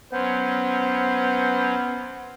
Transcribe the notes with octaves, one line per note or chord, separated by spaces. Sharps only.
F#3 B3 C#4 C5